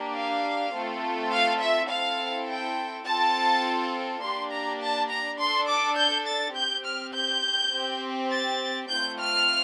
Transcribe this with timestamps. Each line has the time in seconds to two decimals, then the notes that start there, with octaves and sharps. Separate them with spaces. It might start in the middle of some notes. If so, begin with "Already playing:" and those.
Already playing: A#3 D4 G4
0.15 F5
0.74 A3 C4 F4 A4
1.32 F5
1.61 E5
1.90 C4 E4 A4 F5
2.48 G5
3.07 C4 F4 A4 A5
4.23 A#3 D4 G4 C6
4.52 A#5
4.82 A5
5.10 A#5
5.39 D4 A4 C6
5.69 D6
5.98 G6
6.27 A6
6.56 C4 G4 G6
6.85 F6
7.15 G6
7.72 C4 G4
8.30 A6
8.89 A3 C4 F4 G6
9.19 F6